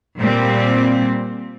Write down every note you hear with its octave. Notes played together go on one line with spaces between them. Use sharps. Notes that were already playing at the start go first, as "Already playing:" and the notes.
A#2 G3 C4